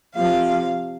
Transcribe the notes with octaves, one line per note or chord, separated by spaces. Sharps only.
F2 C3 F3 F5